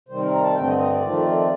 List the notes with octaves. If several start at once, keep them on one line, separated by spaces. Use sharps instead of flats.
C3 D#3 G3 C4 C5
A#4
A#4
A5
G2 D3 A3 C4 G5
D#5
D#5
D5
F2 D#3 A3 C4 F4